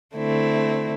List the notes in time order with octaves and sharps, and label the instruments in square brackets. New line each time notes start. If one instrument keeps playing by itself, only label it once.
[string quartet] D3 A3 C4 E4